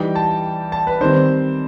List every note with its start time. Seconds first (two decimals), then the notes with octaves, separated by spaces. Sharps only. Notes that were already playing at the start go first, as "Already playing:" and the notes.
Already playing: E3 G3 D#4 G5
0.16 A5
0.72 A5
0.87 B4
1.01 D#3 G3 C4 C5